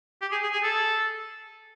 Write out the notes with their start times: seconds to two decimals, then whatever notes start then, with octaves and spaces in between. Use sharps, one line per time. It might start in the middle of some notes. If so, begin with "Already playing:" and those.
0.22 G4
0.32 G#4
0.43 G#4
0.53 G#4
0.63 A4